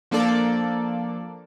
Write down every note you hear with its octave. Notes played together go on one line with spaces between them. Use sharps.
F3 A#3 D4 A4 D5